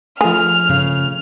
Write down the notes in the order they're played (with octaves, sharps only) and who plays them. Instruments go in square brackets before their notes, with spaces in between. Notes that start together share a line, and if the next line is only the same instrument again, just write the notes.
[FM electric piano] F3 A3 [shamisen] G#4 [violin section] F6
[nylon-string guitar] C#3